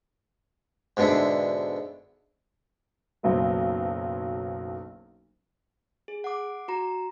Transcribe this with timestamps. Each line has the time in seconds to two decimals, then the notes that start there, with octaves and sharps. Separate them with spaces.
0.97 G#2 B2 D3 D4 E4
3.23 F#1 B1 F#3 C5
6.08 G#4
6.24 F#5 D6
6.68 F#4 A#5